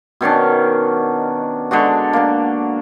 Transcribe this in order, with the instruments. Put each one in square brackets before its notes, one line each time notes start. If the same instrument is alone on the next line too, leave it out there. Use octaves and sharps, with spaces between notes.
[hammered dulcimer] B2 D#3 C#4 D4
D3 G#3 D4 F#4
A#3 D4